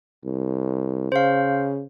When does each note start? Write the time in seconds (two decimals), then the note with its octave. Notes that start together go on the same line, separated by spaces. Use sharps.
0.24 C2
1.12 C#3 C5 F5